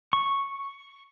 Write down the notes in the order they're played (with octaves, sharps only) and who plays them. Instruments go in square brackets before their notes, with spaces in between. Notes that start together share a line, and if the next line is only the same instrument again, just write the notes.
[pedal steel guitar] C#6